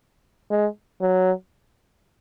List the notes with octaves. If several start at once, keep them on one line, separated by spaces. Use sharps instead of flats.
G#3
F#3